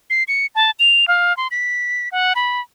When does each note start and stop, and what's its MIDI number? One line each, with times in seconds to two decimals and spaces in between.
0.10 0.23 96
0.28 0.46 97
0.55 0.71 81
0.79 1.08 101
1.08 1.35 77
1.37 1.48 84
1.51 2.09 95
2.12 2.33 78
2.35 2.60 83